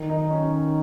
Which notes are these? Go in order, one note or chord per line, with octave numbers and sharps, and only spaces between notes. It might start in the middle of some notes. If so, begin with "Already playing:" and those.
Already playing: D#3
D#4
C#4